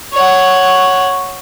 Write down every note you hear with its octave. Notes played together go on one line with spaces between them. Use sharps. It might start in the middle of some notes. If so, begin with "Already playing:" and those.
C#5 F#5